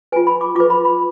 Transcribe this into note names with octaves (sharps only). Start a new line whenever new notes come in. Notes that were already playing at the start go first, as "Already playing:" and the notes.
F4 B4 G#5
B5
D6
F4 B4 D6
B5
B5